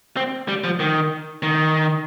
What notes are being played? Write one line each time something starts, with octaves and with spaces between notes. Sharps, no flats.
C4
G3
F3
D#3
D#3